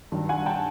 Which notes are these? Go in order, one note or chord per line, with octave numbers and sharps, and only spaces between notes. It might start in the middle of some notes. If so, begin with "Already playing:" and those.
G2 D#3 F#3
F#5 G#5
G5 A5